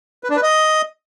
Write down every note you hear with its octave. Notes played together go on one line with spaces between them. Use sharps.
B4
D4
B4
D#5